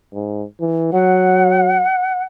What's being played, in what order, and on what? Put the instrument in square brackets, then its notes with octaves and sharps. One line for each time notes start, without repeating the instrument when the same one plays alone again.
[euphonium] G#2
E3
[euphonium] F#3 [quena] F#5